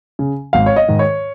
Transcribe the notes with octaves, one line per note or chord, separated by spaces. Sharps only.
C#3
G#1 F5
C#5
D#5
G#2 D#3
C#5